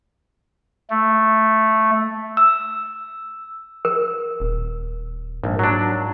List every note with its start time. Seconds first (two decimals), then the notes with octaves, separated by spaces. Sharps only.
0.90 A3
2.37 E6
3.85 A#4
4.40 D#1
5.44 A#1 G#2
5.59 F#3 D4